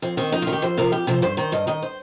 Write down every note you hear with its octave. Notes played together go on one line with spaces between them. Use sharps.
F2 C4
D#3 C4
F2 D#4
F4
D#3
G4
F2 C5
C3 F3 A#4
F2 G4
C3 F3 C5
G2 C5
D#3 C5
G2 D#5
D#3 D#5
C5